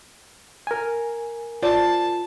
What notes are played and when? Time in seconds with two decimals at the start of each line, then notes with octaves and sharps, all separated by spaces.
0.67 A#4 G#5
1.62 F4 C5 D5 A5